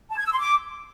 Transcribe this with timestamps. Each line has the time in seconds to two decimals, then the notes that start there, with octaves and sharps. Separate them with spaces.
0.11 A5
0.18 G#6
0.25 E6
0.32 C6
0.40 D6